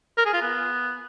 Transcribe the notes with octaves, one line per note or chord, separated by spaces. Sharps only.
A#4
G#4
F4
B3